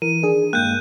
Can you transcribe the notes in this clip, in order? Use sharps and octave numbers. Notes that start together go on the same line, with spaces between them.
E3 A#4 D#7
D#3 D4 G#4
G2 G#3 A#3 G5 F#6 G6